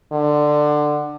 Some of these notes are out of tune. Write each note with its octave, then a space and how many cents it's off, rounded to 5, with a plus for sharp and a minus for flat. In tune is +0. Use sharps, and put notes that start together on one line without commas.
D3 +15